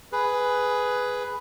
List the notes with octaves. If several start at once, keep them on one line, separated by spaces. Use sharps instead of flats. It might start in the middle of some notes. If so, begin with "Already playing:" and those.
G#4 B4